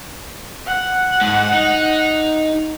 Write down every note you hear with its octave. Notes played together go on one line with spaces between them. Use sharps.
F#5
G#2
D#4